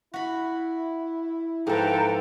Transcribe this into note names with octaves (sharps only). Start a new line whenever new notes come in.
E4 F#4 B5
G#2 F3 A4 B4 G5 A#5